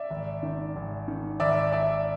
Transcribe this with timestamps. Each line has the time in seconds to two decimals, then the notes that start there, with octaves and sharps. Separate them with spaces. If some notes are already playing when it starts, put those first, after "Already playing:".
Already playing: D5 E5
0.10 G#1
0.43 D#3
0.76 G#1
1.08 D#3
1.40 G#1 D5 E5
1.72 G#1 D5 E5